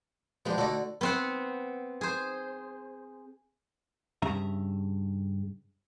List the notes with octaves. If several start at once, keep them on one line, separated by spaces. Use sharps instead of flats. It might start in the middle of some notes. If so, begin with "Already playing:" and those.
F3 G#3 B3 D4 G4
D3 A3 D#4 F#4 D5
B3 C4 F#5
G#4 C5
G2 C#3 E5 A#5